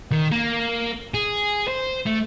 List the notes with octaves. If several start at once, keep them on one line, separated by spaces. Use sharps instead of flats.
D#3
A#3
G#4
C5
A3